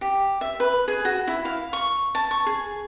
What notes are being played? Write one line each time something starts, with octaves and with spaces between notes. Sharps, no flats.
G4
E5
B4
G#4
F#4
E4
F5
C#6
A5
C#6
G#4